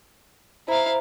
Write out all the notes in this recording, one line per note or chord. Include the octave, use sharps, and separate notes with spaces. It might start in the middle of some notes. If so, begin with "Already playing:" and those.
E4 C5 F5 A#5